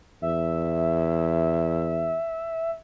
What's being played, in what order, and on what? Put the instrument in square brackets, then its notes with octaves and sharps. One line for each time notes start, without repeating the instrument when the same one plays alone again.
[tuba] E2 [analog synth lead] E5